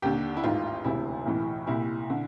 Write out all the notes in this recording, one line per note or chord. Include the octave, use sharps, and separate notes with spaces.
D#2 D3 G4
E4
A1 G#2 D#3 F4
E1 D2 C3 E4
B1 A2 E3
C2 A#2 E4
D3